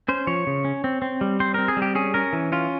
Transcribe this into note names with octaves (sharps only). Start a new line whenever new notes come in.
C#4 C5
F3 C#5
C#3
C#4
C4
C4
G3
C4 C5
C4 A#4
G#4
G3
G4
C#4 G#4
C#4 A#4
E3
C#4 F4